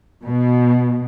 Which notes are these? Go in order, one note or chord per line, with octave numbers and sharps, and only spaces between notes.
B2